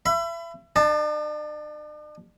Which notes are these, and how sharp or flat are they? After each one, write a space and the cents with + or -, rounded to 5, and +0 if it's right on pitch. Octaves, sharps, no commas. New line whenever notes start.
E5 +35 B5 +25
D4 +45 A5 +5